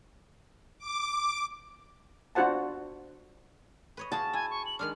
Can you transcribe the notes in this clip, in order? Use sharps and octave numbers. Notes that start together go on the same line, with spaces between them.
D6
D4 F4 F#4 C5 F#5 A5
B4 C#5 D#5
F4 F#4 G#4 A5
E4 G#5
C#6
F#7
D#3 G#3 D4 F6